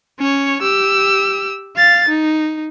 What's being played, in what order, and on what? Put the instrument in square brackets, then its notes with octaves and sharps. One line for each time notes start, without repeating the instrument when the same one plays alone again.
[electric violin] C#4 C#5
G4 E6
F5 A6
D#4